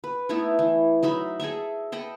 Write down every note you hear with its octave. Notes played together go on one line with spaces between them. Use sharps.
B4
A3 B3 D#4 E4
E3
F#3 D#4 E5 B5
G#4 A4 D#5 E5
A4 D#5 G5 B5